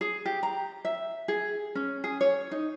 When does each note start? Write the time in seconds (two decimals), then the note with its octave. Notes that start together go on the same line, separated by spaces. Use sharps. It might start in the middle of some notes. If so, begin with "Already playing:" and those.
0.01 G#4
0.25 G4
0.43 A#5
0.85 E5
1.28 G#4
1.75 C#4
2.04 G#4
2.21 C#5
2.51 D#4